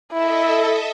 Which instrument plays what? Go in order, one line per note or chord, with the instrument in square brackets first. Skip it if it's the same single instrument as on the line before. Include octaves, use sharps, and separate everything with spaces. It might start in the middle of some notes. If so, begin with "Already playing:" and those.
[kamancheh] E4 [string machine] A4 D#5 E5